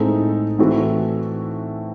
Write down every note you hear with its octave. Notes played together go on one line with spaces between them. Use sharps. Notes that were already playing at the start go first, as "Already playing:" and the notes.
Already playing: A2 G#3 C4 D#4 A4
A2 E3 C4 F#4 A4